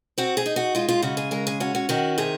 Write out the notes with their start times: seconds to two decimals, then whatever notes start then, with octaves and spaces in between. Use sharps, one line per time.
0.18 C4 F#4
0.37 G#4
0.46 D#4
0.56 F#4
0.75 G#3 F4
0.88 F4
1.02 C#3 F#4
1.17 G#4
1.31 G#3 A#4
1.47 G#4
1.60 C#4 F#4
1.75 F#4
1.89 D#3 F#4
2.18 C3 G#4